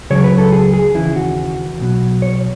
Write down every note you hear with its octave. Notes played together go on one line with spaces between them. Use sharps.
C#2 C#3 F#3 C#5
B4
A4
G#4
G#4
D#2 C#3 E3 E4
F#4
B1 B2 F#3
C#5